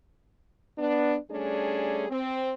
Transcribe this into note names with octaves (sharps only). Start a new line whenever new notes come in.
B3 D4
G3 A3 C#4 D4 G#4
C4